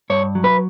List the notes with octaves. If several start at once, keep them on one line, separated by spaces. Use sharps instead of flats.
G2 C#5
F#3
B4